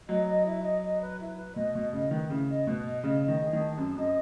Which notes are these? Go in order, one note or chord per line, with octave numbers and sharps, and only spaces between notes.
F#3 D#5
D#5
E4
D#5
D#5
B4
E4
B4
B2 D#5
B2 D#5
C#3 D#5
D#3 B4
C#3 E4
D#5
B2 B4
D#5
C#3 D#5
D#5
D#3
G#4
D#3
A5
F#2 G#4
F#2 D#5